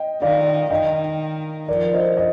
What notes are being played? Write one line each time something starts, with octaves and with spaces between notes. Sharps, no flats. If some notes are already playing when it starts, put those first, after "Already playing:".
Already playing: D#5 G5
D#3 D5 F5
D#3 D#5 G5
F3 A#4 D5
C5 D#5
D#5